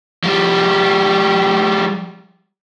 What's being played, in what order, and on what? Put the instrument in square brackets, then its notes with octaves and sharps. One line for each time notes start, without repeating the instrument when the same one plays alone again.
[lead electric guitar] F3 G3